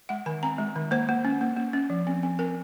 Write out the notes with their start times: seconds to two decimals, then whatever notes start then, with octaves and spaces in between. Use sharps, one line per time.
0.09 G#3 F#5
0.26 D#3 G#5
0.43 C4 A#5
0.58 G#3
0.76 D#3
0.91 A#3 C5
1.09 A#3
1.25 C#4
1.41 A#3
1.57 A#3
1.73 C#4
1.90 F3
2.07 C4
2.23 C4
2.39 C4 A#4